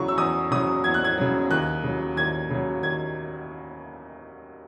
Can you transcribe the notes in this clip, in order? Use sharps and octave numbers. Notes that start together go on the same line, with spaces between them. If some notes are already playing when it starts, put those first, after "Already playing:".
Already playing: E2 C#3 F#3 C#6
E6
E2 D#6
C#3 F#3 D#6
E2 G#6
F#6
G#6
C#3 F#3
D#2 F#6
C#3 F#3
D#2 G#6
C#3 F#3
D#2 G#6